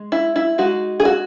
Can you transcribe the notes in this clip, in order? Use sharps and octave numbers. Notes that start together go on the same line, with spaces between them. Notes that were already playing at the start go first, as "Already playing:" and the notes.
Already playing: G#3
E4
E4
G#3 D#4 F#4
G#4
F#4